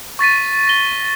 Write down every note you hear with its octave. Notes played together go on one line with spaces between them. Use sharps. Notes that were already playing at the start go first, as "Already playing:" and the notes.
C#6 A6 B6 D#7
A#6 G7